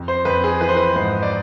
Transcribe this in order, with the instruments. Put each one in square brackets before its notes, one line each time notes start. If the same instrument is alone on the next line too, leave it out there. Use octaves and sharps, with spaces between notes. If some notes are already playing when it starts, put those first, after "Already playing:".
Already playing: [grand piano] F2
C5
F2 B4
G#4
E3 B4
C5
B4
G#2 C5
D5